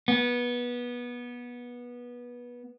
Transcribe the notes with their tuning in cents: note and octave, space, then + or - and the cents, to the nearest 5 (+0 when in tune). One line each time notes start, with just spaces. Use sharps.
B3 -20